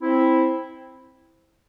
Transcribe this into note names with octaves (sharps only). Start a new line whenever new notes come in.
C4 E4